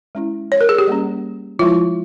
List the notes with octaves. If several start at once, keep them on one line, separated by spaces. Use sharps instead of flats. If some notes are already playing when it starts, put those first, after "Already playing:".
G#3 C#4 E4
C#5
A#4
G#4
G4
G3 A#3 C#4
F3 G#3 E4 F4